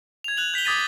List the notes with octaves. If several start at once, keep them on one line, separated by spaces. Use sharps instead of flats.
G#6 F7
F#6 F7 F#7
G6 B6 F7 G7
D6 D#6 G#6 A6 B6 D#7